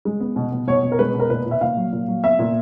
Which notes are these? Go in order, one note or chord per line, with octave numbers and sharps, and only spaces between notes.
G#3
B3
B2
B2
B2 C#5
B2
A#4
G#3 B4
B2
A#4
A#2 B4
A#2
E5
A#2 F5
F#3
A#2
F#3
B3 E5
A#2